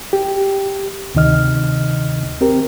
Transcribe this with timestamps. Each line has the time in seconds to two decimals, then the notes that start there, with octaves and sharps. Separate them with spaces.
0.13 G4
1.15 D2 C3 D#3 D#5 F6
2.41 C4 G4 A#4